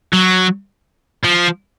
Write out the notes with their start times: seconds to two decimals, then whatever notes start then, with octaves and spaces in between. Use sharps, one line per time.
0.13 F#3
1.25 F3